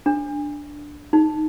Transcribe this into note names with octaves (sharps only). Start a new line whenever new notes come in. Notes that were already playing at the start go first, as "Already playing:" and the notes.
D4
D#4